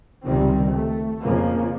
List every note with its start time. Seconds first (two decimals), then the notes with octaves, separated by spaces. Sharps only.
0.25 C#2 C3 D#3 G3 C4
0.71 A3
1.23 F2 C#3 F3 A#3